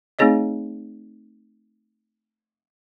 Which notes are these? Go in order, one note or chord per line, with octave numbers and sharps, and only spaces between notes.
A3 C4 D#4 G#4 C#5 D#5